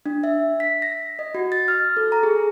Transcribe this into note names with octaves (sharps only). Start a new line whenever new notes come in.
D4
E5
B6
A#6
D#5
F#4
A6
F6
A4
A#5
G#4